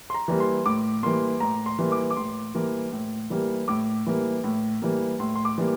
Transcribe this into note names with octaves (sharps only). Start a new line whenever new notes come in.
C6
A#5
E3 G3 A#3
C6
A2 D6
E3 G3 A#3 C6
A2 A#5
C6
E3 G3 A#3
D6
D6
A2 C6
E3 G3 A#3
A2
E3 G3 A#3
A2 D6
E3 G3 A#3
A2
E3 G3 A#3
A2 C6
C6
D6
E3 G3 A#3